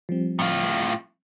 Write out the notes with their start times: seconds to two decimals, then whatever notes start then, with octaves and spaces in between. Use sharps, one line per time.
0.09 F3 G3 C4
0.39 A2 F4